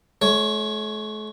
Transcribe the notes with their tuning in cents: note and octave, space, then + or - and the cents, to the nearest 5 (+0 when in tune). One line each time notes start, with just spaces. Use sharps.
A3 -45 C#5 +5